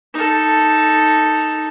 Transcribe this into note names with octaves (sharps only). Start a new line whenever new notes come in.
D#4 A4